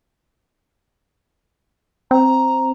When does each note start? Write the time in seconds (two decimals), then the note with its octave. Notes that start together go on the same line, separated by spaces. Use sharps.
2.11 C4 A#5